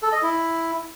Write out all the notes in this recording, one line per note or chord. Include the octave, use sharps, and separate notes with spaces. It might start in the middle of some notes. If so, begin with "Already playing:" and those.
A4
D#5
E4